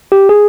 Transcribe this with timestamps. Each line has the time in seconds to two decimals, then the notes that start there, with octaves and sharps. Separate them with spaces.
0.12 G4
0.29 G#4